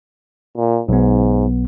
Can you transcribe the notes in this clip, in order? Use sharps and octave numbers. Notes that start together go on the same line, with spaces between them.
A#2
B1 G#2 B3